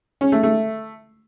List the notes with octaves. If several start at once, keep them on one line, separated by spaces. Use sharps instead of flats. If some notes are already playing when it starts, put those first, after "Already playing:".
C#4
A3
A3